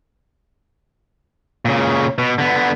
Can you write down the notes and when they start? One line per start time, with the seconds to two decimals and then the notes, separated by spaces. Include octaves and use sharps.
1.65 A#2 C#3
2.18 B2
2.38 D3 B3